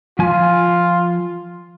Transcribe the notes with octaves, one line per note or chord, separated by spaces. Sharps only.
F3 F4 G#5